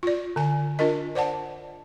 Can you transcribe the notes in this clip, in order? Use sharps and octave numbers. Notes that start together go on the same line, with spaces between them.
F4 D5
D3 G#5
D4 F4 A#4 D#5
C5 D5 F#5 A5